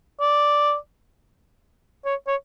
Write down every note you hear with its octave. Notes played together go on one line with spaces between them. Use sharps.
D5
C#5
C#5